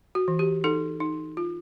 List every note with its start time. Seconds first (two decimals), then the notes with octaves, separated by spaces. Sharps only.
0.15 F#4
0.28 E3
0.39 G4
0.64 D#4 A4
1.00 D#4
1.37 F4